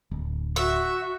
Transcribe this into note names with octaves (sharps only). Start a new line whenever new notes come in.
D1
F#4 E5